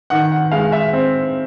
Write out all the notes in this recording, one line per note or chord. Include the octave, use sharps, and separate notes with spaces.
D#3 F#5
F#5
G#3 F5
E5
C4